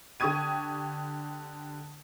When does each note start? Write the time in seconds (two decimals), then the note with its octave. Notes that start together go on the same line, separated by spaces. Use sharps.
0.20 D3 G4 C#6 D#6 G#6 D#7